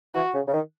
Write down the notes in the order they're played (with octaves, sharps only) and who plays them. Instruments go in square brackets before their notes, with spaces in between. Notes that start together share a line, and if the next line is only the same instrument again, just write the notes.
[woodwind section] E3 [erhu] F#4
[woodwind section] C#3
C#3
D#3